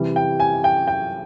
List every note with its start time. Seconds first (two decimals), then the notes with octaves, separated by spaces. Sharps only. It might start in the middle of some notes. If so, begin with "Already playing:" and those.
Already playing: C3 E3 G3
0.16 G5
0.40 G#5
0.64 G5
0.87 G5